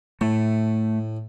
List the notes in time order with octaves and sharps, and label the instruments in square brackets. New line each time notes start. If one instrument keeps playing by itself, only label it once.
[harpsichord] A2 [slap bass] A3